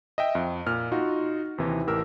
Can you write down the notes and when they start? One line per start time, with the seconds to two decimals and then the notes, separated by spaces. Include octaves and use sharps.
0.18 D#5 E5 G5
0.35 F2
0.67 A#2 F6
0.92 D#4 F4 F#4
1.58 D#2 C3 E3
1.87 A1 E3 G4 A#4 E6